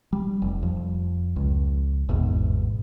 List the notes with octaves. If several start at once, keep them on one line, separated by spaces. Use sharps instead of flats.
G3
F1
F2
C#2
G#1 E2 G#2 B2